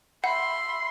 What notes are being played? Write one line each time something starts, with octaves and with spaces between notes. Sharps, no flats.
E5 F#5 B5 C6